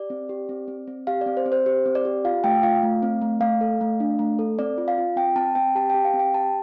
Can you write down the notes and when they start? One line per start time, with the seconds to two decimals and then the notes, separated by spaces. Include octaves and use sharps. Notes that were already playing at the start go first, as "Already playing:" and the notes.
Already playing: G4 D5
0.10 C4
0.29 G4
0.49 C4
0.68 C4
0.87 C4
1.07 G4 F5
1.21 C4 D5
1.37 C5
1.46 C4
1.52 C5
1.66 G4 C5
1.86 C4
1.95 D5
2.05 G4
2.25 F4 F5
2.44 A3 G5
2.63 F4 F5
2.83 A3
3.03 C4
3.22 A3
3.41 A3 F5
3.61 A4
3.81 A3
4.00 D4
4.19 A3
4.39 A4
4.59 C4 D5
4.78 F4
4.88 F5
4.98 F4
5.16 C4 G5
5.36 C4 A5
5.55 C4 G5
5.75 G4 A5
5.90 G4 G5
6.05 F5
6.14 C4
6.19 G5
6.34 G4 A5